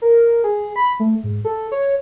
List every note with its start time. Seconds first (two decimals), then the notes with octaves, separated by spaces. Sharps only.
0.02 A#4
0.44 G#4
0.76 B5
1.00 A3
1.24 G#2
1.45 A4
1.72 C#5